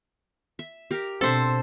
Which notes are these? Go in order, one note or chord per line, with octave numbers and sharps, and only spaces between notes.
E5
G4 A#4
B2 C4 D4 A4 C5 E5